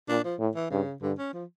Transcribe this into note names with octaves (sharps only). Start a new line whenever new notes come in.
A#2 D4
F3
A2
E3
G2 C#3
G2 D3
C#4
F3